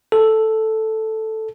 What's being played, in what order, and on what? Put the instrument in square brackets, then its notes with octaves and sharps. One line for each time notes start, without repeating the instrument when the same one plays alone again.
[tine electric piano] A4